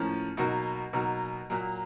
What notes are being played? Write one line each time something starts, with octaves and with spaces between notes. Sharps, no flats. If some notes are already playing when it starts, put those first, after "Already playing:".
Already playing: A2 F3 A#3 C#4
B2 F#3 A#3 D#4 F#4
B2 F#3 A#3 D#4 F#4
A#2 F#3 A#3